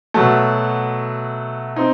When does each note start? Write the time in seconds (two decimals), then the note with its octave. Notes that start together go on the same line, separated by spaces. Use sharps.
0.14 B2 F#3 A3
1.76 C4 D#4